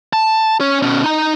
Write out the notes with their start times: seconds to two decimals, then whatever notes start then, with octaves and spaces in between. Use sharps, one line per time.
0.13 A5
0.60 C#4 C#5
0.82 B2 C#4
1.04 D#4 A#5